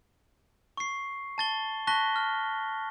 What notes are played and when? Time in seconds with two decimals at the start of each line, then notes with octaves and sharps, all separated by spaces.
0.77 C#6 C7
1.38 A5 A6 G7
1.87 A5 C#6 F#6 A#6 B6 G7
2.16 F6